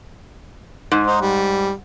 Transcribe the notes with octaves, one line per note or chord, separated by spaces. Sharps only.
G#2
D#4 C5
G3